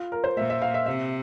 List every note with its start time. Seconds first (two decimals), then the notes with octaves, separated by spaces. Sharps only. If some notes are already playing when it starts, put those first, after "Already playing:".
Already playing: F4
0.12 A#4
0.24 C5
0.37 A#2 E5
0.50 E5
0.62 F5
0.74 E5
0.86 C3 E5